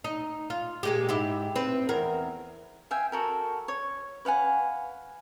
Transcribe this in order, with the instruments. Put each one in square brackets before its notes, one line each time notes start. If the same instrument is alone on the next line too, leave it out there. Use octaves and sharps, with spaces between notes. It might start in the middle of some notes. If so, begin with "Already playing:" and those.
[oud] D#4
F4
A#2 G#3 G4
G#2 E4 G4
C4 B4
E2 A#4
[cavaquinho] E5 F5 G5 G#5
F#4 A4 A#4
C#5
B4 F5 F#5 G#5